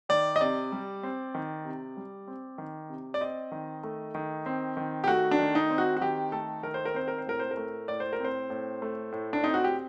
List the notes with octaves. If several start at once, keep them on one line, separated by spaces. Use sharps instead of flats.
D#3 D5
D#5
C3 D5
G3
C4
D#3
C3
G3
C4
D#3
C3
D5
C4 D#5
D#3
A3
D#3
C4
D#3
G4
A3 F#4
D4
D#3
D#4
C4
F#4
F#4
D#3 G4
A3 A4
D#3 A#4
C5
A#4
C4 C5
A#4
C5
A2 A#4
C5
A#4
A3
A2 D5
C5
A#4
C4
C5
A2
A3
A2
D4
C4 D#4
F#4
G4